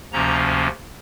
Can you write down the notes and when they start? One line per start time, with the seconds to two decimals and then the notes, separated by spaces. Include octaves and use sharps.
0.12 D2 C3 F3 A#3 C#4 A#5